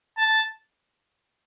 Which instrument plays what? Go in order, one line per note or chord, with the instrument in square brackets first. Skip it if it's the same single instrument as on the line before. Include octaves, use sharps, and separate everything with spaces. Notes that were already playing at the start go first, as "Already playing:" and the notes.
[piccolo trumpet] A5